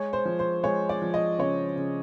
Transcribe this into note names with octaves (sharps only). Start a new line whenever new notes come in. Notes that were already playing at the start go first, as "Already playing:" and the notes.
Already playing: G#3 C#5
C5
F3
C5
G#3 C#5
D5
F3
D#5
C#3 C#5
C#3